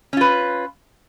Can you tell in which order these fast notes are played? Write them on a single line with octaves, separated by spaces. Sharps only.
C#4 F4 B4